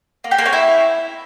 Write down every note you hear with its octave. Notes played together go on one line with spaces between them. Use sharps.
A#3
G4
A#3
C#4
E4